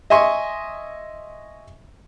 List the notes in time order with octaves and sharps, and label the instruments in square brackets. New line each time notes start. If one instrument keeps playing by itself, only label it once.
[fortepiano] D#5 E5 G#5 C6 C#6